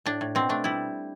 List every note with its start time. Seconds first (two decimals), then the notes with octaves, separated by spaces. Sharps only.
0.06 A2 D4
0.21 A2
0.35 B2 C4
0.49 A3 D4
0.64 G3 E4